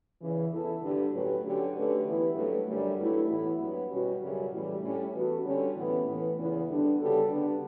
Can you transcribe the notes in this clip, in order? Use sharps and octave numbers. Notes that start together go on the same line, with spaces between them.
E2 C#3 E3
E3 B3 E4 A4
G2 D3 G3
A2 F#3 C#4 G4 B4
D3 F#3 C#4 G4
D3 A3 C#4 G4 B4
E3 B3 E4 B4
G2 F#3 A3
F#2 D3 G3
G2 F#3 A3 E4
A2 E3 B3 E4
G2 F#3 B3
B2 G3 C#4 F#4
F#2 C#3 G3 C#4
A2 E3 G3
A2 G3 C#4
E3 B3 F#4 A4
D3 G3 C#4
A2 E3 B3
A2 E3 B3
E2 C#3 E3 B3 E4
D3 G3 B3 D4
C#3 G3 B3 F#4 A4
D3 G3 B3 D4